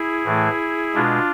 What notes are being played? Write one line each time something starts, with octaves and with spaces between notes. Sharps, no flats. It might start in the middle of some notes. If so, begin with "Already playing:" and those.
Already playing: E4 G#4
A2 E3 A3
B2 G#3 D4 F4